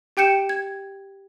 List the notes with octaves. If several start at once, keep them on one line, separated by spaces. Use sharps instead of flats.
G4 G5 G6 C#7 E7
G#6